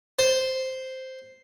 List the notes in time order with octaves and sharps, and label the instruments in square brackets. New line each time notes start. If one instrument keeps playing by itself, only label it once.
[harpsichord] C5